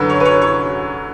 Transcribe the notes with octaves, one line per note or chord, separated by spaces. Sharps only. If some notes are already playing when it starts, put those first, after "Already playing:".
Already playing: F#2 D3 F#3 B4
C#5
B4
C#5
C#5